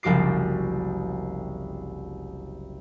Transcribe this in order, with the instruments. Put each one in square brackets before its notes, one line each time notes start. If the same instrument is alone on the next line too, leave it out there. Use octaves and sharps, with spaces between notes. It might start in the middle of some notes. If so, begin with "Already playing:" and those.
[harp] F#1 C2 F3 F#4 D6 C7